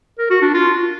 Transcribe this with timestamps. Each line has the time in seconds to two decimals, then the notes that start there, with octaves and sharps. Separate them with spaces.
0.19 A#4
0.30 F#4
0.42 D4
0.54 F4